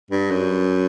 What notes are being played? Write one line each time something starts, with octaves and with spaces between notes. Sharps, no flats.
G2
F#2